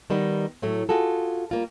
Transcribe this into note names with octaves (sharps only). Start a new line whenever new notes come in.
D#3 G3 B3 D#4
A2 F#3 A3
F4 F#4 G#4 A4
G3 A#3 F4